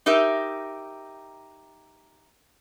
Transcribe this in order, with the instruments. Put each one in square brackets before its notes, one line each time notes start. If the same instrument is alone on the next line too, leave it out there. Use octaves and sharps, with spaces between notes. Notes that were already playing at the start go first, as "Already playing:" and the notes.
[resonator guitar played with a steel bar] D#4 G4 A#4 E5